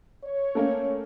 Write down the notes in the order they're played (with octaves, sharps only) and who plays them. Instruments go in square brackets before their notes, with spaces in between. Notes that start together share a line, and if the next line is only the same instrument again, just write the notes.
[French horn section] C#5
[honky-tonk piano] A3 A#3 C#4